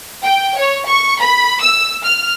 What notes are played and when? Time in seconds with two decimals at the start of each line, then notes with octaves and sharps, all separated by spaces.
0.24 G5
0.56 C#5
0.87 C#6
1.20 B5
1.61 E6
2.05 F6